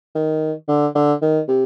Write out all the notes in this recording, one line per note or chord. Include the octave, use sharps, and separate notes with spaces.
D#3
D3
D3
D#3
C3